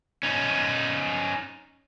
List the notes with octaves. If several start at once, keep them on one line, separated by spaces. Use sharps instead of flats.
C#4 D#4